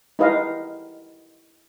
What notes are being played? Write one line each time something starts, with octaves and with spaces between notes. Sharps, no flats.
D#4 E4 G4 B4 D#5 F5